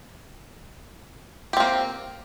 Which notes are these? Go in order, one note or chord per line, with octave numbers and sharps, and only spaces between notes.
A#3 C4 G4